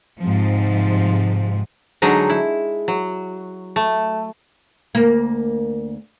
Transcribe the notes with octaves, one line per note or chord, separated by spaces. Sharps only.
G#2 C3 F3
D3 F#3 G#3 D#4
E4
F#3
A3
D2 A#3